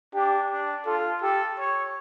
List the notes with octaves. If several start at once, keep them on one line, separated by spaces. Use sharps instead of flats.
D4 G4
D4
F4 A4
G4 A4
C#5